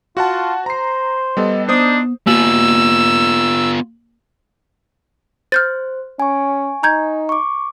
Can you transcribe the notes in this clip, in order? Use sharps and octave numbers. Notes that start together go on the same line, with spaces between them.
F4 F#4 F#5 A5
C5 A#5 C7
G3 B3 A4 D#5
B3 D4 D#4 C5 D#6
A#3 B3 F4 E6 F#7
C5 F6 G6 A6
C#4 G#5 C#6
D#4 A#5 G6 G#6
C#6 D6